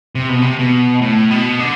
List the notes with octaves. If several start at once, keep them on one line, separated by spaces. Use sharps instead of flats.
C3
B2
C3
B2
A2
B2
D3